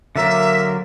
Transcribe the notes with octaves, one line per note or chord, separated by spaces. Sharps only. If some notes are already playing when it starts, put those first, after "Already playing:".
D3 F#3 A#3 A#4 E5